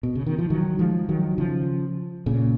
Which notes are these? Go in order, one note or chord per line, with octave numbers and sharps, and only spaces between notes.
B2
C#3
D#3
F3
D#3 F#3
F3 G#3
D#3 F#3
C#3 F3
A#2 C#3